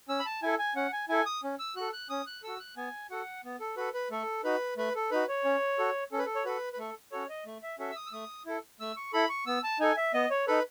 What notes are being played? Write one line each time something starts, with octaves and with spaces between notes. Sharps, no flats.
C#4 E6
B5
A5
E4 A4 G#5
G#5
C#4 F#5
G#5
E4 A4 G#5
D#6
C#4
E6
F#4 A4 F#6
F#6
C#4 D#6
F#6
F#4 A4 E6
F#6
B3 G#5
F#4 A4 F#5
B3
A4
F#4 A4 B4
B4
A3 A4
D#4 F#4 B4
A3 B4
A4
D#4 F#4 B4
C#5
C#4
F#4 A4
C#4 A4
B4
A4
C#5
F#4 A4 B4
B4
A3 A4
C#4 F#4 A4 C#5
D#5
A3
E5
C#4 F#4 A4 E5
E6
D#6
E6
A3 D#6
E4 A4
A3 E6
C#6
E4 A4 B5
C#6
B3 E6
A5
D#4 A4 G#5
E5
B3 D#5
C#5
D#4 A4 B4